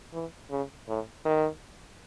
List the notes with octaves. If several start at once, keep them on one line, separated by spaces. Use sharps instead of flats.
E3
C#3
A2
D#3